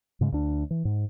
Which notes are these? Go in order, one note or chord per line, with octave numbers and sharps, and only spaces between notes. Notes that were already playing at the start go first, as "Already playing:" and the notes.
G#2 C#3 G#3
D2 D4
E3
G#2